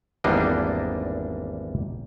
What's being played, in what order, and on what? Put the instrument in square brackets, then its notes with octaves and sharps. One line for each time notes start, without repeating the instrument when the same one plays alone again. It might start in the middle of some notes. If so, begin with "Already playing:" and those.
[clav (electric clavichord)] G#1 E2 G3 A#3 D4 D#5